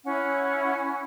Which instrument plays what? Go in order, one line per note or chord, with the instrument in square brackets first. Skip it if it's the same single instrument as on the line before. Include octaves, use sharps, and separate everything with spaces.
[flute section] C#4 E4 F#5